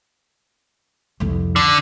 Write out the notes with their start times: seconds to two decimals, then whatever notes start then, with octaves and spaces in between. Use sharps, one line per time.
1.20 C2 F2
1.56 D3